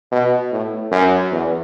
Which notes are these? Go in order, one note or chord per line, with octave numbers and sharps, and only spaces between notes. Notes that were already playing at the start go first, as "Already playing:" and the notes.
B2
A2
F#2
E2